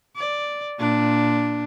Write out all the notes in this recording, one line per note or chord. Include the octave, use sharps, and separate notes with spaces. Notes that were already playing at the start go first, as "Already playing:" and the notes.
D5
A#2 D4